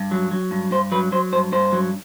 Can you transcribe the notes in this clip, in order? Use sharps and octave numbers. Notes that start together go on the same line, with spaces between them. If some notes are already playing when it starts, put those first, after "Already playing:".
Already playing: G2
F#3
F#3
G2
G2 C5
F#3 B4
F#3 C5
G2 C5
G2 C5
F#3